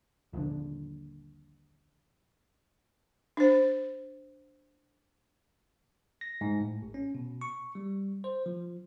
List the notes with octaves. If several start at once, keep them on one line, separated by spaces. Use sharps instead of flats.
D#1 A#1 D3
D4 C5
A#6
G#2
A2
A1
C#4
B2
C#6
G3
C5
F3